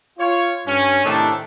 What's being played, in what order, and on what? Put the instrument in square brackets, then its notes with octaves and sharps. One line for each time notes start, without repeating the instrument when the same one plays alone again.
[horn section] F4 C#5
G2 C#4
A2 C3 D#3 A3 D4 A4